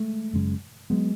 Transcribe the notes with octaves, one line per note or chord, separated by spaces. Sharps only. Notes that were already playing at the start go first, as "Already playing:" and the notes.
Already playing: G#3 A3
F#1 F#2 C#3 G#3
F#3 G#3 B3